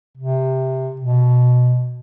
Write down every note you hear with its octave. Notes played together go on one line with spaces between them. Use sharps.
C3
B2